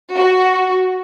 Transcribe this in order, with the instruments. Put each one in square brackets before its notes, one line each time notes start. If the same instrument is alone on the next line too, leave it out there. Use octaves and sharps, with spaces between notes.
[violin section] F#4